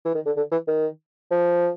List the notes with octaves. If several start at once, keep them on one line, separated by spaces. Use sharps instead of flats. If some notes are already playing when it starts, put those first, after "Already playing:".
E3
D#3
D3
D3
E3
D#3
F3